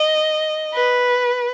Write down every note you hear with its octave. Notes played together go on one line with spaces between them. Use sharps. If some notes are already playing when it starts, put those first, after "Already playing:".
Already playing: D#5
B4